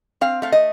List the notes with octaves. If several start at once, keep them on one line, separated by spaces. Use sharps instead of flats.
C4 F5
A3 F5
D#5